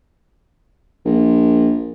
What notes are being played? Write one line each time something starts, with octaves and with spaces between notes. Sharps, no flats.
A#1